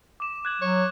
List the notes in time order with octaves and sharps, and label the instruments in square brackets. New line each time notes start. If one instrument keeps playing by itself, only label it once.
[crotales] D6 E7
F#6 G#6 F#7
[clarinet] F#3 [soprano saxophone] C#5